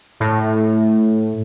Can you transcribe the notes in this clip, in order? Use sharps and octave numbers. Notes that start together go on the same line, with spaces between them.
A2